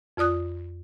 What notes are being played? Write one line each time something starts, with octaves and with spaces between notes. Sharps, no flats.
F2 F4 D5 D#6 F#6